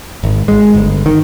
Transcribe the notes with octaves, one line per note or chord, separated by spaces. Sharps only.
G#1
G#3
G1
D#3